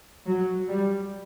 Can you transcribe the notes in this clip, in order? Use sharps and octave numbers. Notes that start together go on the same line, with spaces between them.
F#3
G3